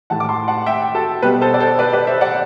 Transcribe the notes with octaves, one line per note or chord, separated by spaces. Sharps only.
A2 E3 A3 F#5 A5
D6
A5 C6
F#5 A5
E5 G5
F#4 A4
B2 G3 G4 B4
A4 C5
D5
A4 C5
B4 D5
B4 D5
C5 E5
D5 F#5